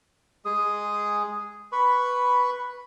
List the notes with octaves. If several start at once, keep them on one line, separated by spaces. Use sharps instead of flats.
G#3 G#4 D#6
B4 B5 C#6